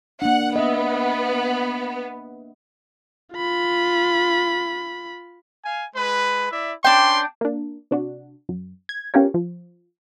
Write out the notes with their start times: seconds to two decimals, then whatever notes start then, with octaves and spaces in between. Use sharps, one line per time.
0.22 A#3 D4 F#5
0.56 B3 D#5 E5
3.33 F4 B5
5.64 F5 G#5
5.96 G#3 B4
6.52 E4 D5 E5
6.84 C#4 D4 B4 G5 C6
7.41 A#3 D4
7.91 C3 D4 F#4
8.49 F#2
8.89 G#6
9.14 B3 C#4 F4 G4 A#4 C#5
9.34 F3